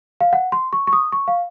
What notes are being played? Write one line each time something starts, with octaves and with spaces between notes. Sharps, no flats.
F5
F#5
C6
C#6
C#6
D#6
C#6
F5